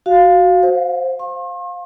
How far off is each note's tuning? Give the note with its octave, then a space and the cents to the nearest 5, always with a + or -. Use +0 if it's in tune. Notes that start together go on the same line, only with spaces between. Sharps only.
F#4 +0 F5 +0
C5 +0 F#5 -40
F5 +20 C6 +45